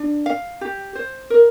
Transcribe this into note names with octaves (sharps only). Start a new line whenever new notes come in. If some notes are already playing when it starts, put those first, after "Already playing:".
Already playing: D4
F5
G4
C5
A#4